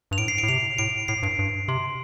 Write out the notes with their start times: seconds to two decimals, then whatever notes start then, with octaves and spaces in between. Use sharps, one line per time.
0.11 G2 F7
0.18 A2 D7
0.28 C7
0.38 D7
0.43 A2
0.48 C3 F7
0.78 A2 D7
1.08 A2 C7
1.23 G2 D7
1.39 G2
1.68 C3 C6